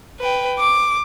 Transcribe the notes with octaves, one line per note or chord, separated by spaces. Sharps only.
B4 G5
D6